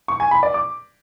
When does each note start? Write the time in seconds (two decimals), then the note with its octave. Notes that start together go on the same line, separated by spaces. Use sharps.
0.08 C#6
0.20 G#5
0.31 B5
0.43 D5
0.54 D6